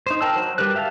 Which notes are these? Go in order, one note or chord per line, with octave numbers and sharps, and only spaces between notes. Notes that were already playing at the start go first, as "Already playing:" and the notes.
D#4 C5
A#4 G5 A5 E6
F#3 C5
G3 G4 A#4 B4 F#6
G4 E5 F5 G5 A5